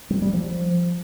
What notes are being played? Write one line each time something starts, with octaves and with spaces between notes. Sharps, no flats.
G3
G3
F3